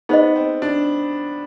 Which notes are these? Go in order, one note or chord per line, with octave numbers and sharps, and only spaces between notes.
B3 D#4 G#4 C5 D#5
C4
D4